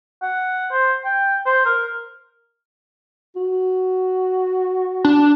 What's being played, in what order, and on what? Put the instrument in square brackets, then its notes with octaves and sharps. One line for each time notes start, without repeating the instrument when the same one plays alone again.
[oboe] F#5
C5
G5
C5
A#4
[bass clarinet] F#4
[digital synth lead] D4